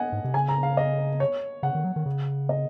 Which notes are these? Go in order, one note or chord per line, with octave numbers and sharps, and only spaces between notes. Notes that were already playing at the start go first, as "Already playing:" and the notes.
Already playing: D#5 F#5 G#5
G#2
C3
C#3 G#5
A#5
F5
D#5
C#5
C#3 F#5
D#3
F#3
D#3
C#3
D#5